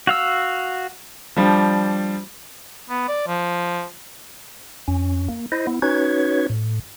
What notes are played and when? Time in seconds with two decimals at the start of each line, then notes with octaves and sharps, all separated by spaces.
0.07 F#4 F5 E6
1.37 F3 G3 D4
2.90 B3
3.08 D5
3.27 F3
4.88 F2 C#4
5.29 A#3
5.52 E4 C5 D#5
5.67 B3 E4
5.82 C#4 D#4 F#4 B4 C#5 G#6
6.50 A2